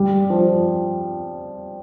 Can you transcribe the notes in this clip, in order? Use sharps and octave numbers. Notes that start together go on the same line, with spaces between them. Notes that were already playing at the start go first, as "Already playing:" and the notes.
Already playing: G3
F3